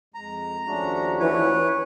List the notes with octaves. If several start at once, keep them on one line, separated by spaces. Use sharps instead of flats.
F2 G#3 A#5
D#2 F3 A3 C#4 D4 F#4
E3 B4 C#5